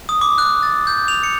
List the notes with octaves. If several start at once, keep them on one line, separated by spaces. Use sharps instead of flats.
D#6
D6
F#6
A6
G6
F7
C#7